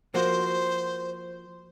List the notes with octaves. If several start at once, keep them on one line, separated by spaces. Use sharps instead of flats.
F3 A#3 F#4 C5